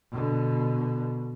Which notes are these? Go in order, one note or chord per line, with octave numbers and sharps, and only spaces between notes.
B2 D3